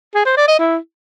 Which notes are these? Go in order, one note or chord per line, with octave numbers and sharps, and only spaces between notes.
G#4
C5
D5
D#5
E4